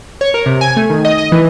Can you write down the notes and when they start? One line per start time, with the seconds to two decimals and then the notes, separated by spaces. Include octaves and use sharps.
0.21 C#5
0.34 A#4
0.46 C3
0.61 G#5
0.77 A3
0.90 D#3
1.05 D#5
1.18 D#5
1.32 E3